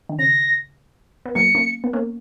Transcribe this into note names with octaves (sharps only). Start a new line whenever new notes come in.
D#3
C#3 A#6
B3
F#3 A#3 C#7
A#3 C#4
B3
A#3 C#4